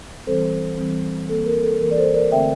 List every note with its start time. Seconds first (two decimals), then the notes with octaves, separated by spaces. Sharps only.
0.27 E3 G3 C4 A4 C5
0.78 E3 G3 C4
1.29 E3 A#3 A4
1.46 A#4
1.63 A4
1.81 E3 A#3 A#4
1.91 D5
1.97 A4 C5
2.14 A#4 D5
2.31 D3 A3 C4 E5 G5